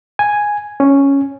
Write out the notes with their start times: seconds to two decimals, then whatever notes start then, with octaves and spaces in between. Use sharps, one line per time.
0.19 G#5
0.80 C#4